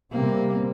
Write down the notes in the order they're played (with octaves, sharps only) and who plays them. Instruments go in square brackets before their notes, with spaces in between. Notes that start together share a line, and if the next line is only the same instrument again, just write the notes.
[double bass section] C3 G3 C4 [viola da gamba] A#3